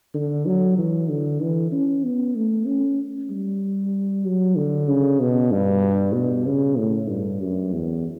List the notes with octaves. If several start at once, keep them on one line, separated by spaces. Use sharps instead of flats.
D3
F#3
E3
D3
E3
C#4
B3
A3
C#4
G3
F#3
D3
C#3
B2
G2
B2
C#3
A2
G2
F#2
E2